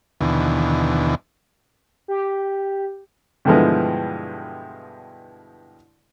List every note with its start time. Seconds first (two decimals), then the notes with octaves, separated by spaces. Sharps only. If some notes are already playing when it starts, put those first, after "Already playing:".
0.21 D#2 B2 D3 E3
2.08 G4
3.45 G2 B2 D3 E3 F3 G#3